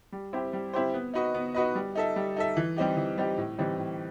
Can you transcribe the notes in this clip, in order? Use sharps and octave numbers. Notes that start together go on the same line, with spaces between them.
G3
C4 E4 G4 C5
G3
C4 E4 G4 C5
B3
D#4 F#4 B4 D#5
B3
D#4 F#4 B4 D#5
G3
D#4 A4 E5
G3
D#4 A4 E5
E3
G3 C4 D#4 G4
E3
G3 C4 D#4 G4
A2
E3 G3 C4 D#4
A2